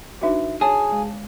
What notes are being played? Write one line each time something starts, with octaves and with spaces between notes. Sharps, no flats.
D4 D#4 F#4 B4 E5
G#4 C#5 G#5 A5
G#3